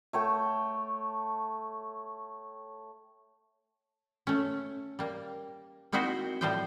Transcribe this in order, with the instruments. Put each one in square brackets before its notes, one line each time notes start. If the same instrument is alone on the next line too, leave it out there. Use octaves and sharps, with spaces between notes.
[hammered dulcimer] A3 C#5 G5
[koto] A3 C#4
G3 A#3
A#3 C4 D#4 E4 F#4 C5
A2 F3 G3 C5 D#5 G5